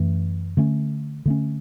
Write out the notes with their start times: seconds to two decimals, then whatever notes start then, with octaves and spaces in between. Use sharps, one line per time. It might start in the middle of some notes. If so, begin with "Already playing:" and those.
Already playing: F#2 E3 A3
0.57 D3 A3 C#4
1.26 D3 A3 C#4